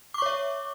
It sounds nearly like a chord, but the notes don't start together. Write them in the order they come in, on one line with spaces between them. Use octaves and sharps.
D6 C#6 C#5 E5